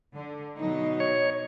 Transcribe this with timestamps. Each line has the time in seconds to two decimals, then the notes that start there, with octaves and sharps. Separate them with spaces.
0.14 D3
0.57 B2 F#3 D#4
1.00 C#5